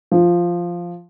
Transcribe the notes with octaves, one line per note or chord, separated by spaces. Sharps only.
F3